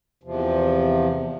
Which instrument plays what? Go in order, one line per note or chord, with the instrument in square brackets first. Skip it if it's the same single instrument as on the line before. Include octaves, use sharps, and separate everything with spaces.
[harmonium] E2 C3 F3